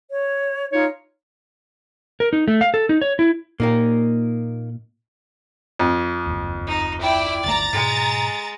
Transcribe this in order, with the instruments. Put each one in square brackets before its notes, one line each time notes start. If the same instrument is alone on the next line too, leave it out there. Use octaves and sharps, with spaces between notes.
[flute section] C#5
[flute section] D#4 F4 [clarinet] C#5
[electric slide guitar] A#4
D#4
A3
F5
A4
D#4
C#5
E4
[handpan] A#2 [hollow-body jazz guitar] A#3 D#4 A#4
[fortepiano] F2
[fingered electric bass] F#1 D#2
[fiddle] D#4
[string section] E4 G5 [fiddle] D5
[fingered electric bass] D1 G1 A3 [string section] A#5 A6
[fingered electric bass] G#2 B2 [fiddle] G#3